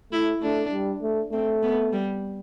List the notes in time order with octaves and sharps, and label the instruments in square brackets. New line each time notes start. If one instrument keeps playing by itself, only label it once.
[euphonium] A3 [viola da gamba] E4
[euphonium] A3 [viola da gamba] D4
[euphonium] G3
A3
[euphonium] A3 [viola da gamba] C4
[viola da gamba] B3
G3